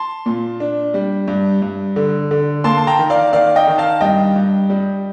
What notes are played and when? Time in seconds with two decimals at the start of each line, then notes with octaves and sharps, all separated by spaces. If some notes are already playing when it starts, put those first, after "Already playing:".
Already playing: A5 C6
0.26 A#2
0.60 D4
0.94 G3
1.28 G2
1.62 G2
1.96 D3
2.31 D3
2.64 A#3 A5 C6
2.78 A5
2.87 G5 A#5
2.99 D#3
3.10 D5 F5
3.33 D#3 D5 F5
3.56 D#5 G5
3.68 D#3
3.78 F5 A5
4.01 G2 D#5 G5
4.36 G2
4.70 G3